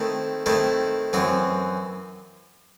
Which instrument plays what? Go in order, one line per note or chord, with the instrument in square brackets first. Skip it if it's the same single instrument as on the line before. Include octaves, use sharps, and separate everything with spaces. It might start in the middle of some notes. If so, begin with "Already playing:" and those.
Already playing: [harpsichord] D#3 A3 C4 E4
D#3 A3 C4 E4
F#2 E3 C4 F#4